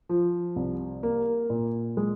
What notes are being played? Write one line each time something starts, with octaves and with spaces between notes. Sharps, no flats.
F3
C2
A#3
A#2
G#3